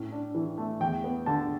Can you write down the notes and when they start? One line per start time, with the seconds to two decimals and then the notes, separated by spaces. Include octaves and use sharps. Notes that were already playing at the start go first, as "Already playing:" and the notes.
Already playing: A2 C#4
0.12 D4
0.35 E3
0.58 A3
0.80 E2 G5
1.04 B3
1.26 D3 A5